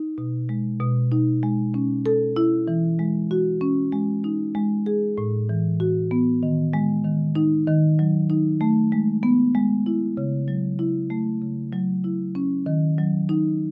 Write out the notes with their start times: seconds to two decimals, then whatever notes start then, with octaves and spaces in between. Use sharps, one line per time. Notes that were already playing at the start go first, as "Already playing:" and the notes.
Already playing: D#4
0.18 B2
0.49 G#3
0.80 B2
1.12 D#4
1.43 G#3
1.74 C#4
2.06 A4
2.36 E4
2.68 E3
2.99 G#3
3.31 F#4
3.61 C#4
3.92 G#3
4.24 D#4
4.55 G#3
4.86 G#4
5.18 A2
5.49 E3
5.80 F#4
6.11 B3
6.43 D#3
6.73 G#3
7.05 D#3
7.35 D#4
7.68 D#3
7.99 F#3
8.30 D#4
8.61 A3
8.92 G#3
9.23 B3
9.55 G#3
9.86 E4
10.17 C#3
10.48 F#3
10.79 E4
11.10 A3
11.42 C#3
11.73 F#3
12.04 E4
12.35 C#4
12.66 D#3
12.98 F#3
13.29 D#4